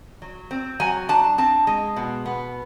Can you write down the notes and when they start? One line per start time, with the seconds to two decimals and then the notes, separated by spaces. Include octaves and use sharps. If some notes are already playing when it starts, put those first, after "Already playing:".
0.22 F#3
0.51 C4
0.80 F#3 G#5
1.09 D4 A5
1.38 C4 A5
1.67 G#3
1.96 B2
2.26 B3